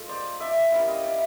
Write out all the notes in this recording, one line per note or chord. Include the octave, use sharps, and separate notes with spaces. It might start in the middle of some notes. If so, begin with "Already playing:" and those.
Already playing: G#3 F4 A4
C5 D5
D5 E5
G3 A#3 C#4 E4 D5 E5
D#5 F5
D5 E5